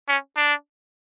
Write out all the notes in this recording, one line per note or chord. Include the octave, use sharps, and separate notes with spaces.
C#4
D4